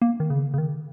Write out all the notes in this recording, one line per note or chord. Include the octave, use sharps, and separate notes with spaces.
A#3
D#3
C#3
C#3
D#3